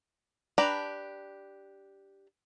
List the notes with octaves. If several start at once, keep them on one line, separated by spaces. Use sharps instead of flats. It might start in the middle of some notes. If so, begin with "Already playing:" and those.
D4 G4 B4 A#5